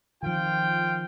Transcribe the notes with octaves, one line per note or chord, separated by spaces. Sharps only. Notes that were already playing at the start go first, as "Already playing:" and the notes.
D#3 F3 F4 F5 G5